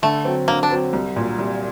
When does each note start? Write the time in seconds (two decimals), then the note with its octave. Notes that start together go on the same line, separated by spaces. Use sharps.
0.02 D3 A3
0.25 F#3 C4
0.48 D3 A#3
0.63 D4
0.71 F#3 C4
0.93 C2
1.16 A#2 F#3
1.39 C2